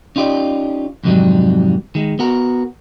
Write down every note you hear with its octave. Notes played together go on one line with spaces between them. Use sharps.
C#4 D#4 F4 G4 D5
F2 G#2 C3 D#3 F#3 G3
D#3 G#3
B3 F#4 A#4